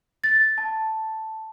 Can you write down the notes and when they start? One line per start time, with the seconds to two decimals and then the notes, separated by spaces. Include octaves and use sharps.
0.24 A6
0.58 A5